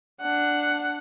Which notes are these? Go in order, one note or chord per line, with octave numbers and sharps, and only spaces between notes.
D4 F#5